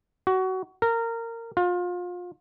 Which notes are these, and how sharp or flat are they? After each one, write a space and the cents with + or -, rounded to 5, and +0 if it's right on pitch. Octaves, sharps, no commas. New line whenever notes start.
F#4 +20
A#4 -20
F4 +30